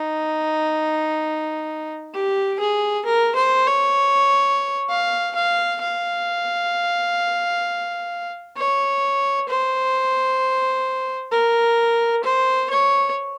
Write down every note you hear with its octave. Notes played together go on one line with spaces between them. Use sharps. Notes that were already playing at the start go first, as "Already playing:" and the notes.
Already playing: D#4
G4
G#4
A#4
C5
C#5
F5
F5
F5
C#5
C5
A#4
C5
C#5